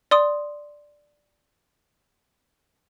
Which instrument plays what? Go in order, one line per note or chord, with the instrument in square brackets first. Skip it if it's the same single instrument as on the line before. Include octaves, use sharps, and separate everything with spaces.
[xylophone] D5 C6 D#6